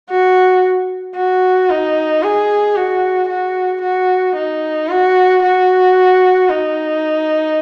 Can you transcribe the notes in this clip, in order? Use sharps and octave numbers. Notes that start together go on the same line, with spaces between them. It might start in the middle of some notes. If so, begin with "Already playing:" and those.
F#4
F#4
D#4
G#4
F#4
F#4
F#4
D#4
F#4
F#4
D#4